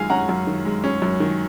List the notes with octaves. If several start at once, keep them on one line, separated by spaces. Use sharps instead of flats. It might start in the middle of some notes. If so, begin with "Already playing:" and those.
Already playing: F#2 D#3 G#3 F5 G#5
C#4 F#5 A#5
F#2
D#3
G#3
C#4
F#2
D#3